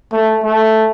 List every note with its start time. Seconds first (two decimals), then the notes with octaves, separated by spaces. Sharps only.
0.13 A3
0.44 A3